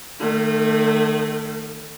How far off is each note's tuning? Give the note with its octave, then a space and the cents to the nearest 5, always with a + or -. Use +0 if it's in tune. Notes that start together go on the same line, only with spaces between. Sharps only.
D#3 -30 A3 +15